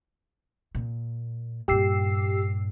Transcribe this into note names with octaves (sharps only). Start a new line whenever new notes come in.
A#2
G2 A#2 G4 E6 C7